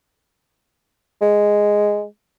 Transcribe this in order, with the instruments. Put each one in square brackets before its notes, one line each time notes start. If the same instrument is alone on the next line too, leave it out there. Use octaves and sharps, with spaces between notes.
[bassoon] G#3